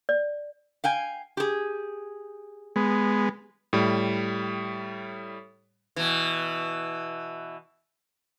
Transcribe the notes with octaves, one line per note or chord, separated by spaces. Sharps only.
D5
F5 G5 G#5
G4 G#4
G#3 B3
A2 G3
B2 E3